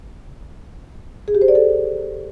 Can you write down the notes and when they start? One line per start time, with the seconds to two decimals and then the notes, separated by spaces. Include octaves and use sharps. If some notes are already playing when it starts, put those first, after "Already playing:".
1.28 G#4
1.35 G4
1.41 C5
1.48 D5
1.55 A4